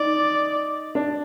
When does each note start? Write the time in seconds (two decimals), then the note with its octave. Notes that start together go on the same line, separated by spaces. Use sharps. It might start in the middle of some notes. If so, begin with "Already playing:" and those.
Already playing: D#4 D5
0.95 D4